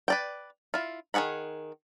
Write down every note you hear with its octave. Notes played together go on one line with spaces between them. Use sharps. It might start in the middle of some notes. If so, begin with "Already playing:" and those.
B4 D5 G5
E4 F4
D#3 F3 G#4 F#5 B5